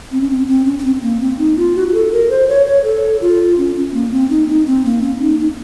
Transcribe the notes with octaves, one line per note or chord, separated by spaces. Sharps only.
C4
C#4
C4
C4
C#4
C#4
C4
A#3
C4
D#4
F4
F#4
F#4
A4
A#4
C5
C#5
C#5
A4
F4
C#4
C#4
A#3
C4
D#4
D#4
C4
A#3
C#4
D#4
D#4